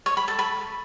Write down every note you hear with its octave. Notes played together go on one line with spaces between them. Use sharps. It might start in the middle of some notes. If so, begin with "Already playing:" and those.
C#5
B5
A4
B5